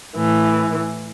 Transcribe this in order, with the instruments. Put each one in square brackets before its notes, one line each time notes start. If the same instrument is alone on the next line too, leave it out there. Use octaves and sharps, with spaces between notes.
[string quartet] A2 E3